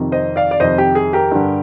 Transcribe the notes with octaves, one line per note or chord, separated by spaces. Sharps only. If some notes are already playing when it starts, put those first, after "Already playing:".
Already playing: F2 C3 D#3
C5 D#5
D5 F5
D5
F2 C3 D#3 C5 D#5
G4
G#4
G4 A#4
G2 D3